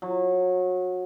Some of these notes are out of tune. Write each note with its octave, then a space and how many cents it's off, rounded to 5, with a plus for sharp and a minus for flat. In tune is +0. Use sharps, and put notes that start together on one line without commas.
F#3 -25